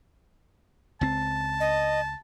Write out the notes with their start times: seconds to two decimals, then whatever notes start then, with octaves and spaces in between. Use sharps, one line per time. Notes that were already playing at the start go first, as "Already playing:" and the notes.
1.01 C#2 C4 A5
1.60 D#5